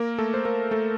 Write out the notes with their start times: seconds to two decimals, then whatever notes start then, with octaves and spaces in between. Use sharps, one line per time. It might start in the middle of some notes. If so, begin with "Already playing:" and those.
Already playing: A#3 A#4
0.18 A3 A4
0.34 C5
0.45 A#3 A#4
0.71 A3 A4